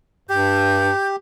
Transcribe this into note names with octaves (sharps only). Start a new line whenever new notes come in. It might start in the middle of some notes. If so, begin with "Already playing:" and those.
G2 G4 G6